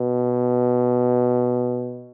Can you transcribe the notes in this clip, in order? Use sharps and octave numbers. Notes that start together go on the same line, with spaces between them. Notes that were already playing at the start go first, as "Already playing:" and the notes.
Already playing: B2